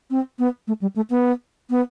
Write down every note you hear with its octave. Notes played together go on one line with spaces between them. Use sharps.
C4
B3
A3
G3
A3
B3
B3